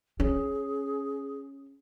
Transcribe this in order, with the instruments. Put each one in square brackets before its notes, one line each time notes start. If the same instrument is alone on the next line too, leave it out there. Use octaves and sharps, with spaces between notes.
[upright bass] C#4 [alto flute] G#4